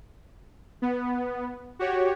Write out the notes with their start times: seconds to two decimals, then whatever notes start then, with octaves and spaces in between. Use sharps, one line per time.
0.82 B3
1.79 F#4 G4 C#5